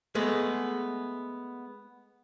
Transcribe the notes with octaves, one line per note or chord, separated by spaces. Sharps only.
G#3 A3 B3